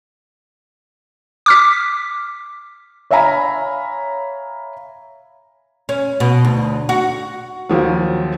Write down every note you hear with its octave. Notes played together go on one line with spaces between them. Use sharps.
D6 F6 B6
C#5 E5 F5 G#5 A#5 B5
C#4
B2
D2
F#4
D#2 F3 F#3